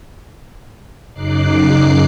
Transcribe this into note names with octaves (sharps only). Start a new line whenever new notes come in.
F#2 C#3 D#4 D6 F#6 C7